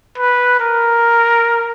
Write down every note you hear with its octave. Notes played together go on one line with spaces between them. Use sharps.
B4
A#4